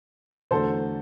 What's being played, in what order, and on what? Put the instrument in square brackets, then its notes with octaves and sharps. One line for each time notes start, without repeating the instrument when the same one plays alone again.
[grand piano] E2 D3 F#3 A3 [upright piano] A4 C5